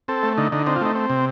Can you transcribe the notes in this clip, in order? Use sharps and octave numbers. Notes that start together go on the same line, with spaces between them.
C4 A4
A3
D3 D#4
D3 D#4
C4 D#4
F4
A3 D#4
C4
C3